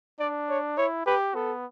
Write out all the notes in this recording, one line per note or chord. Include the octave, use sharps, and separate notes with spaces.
D4 D5
C#5
E4 C#5
G4 B4
B3 A4